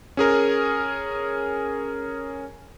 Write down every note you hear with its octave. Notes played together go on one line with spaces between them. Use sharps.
C#4 G#4 A#4